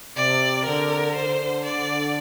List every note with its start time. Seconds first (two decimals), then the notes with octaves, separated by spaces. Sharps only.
0.16 C3 D5
0.66 D3 A#4
1.15 D3 C5
1.65 D5